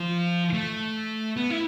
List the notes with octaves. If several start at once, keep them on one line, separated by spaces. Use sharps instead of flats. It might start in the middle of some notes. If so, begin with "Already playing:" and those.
Already playing: F3
A3
B3
E4